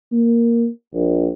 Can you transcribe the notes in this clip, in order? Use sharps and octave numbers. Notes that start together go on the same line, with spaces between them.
A#3
A#1